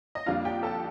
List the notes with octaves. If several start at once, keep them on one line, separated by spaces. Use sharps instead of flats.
D#5
F2 D3 G3 A#3 D4 F4 F5
G4 G5
A4 A5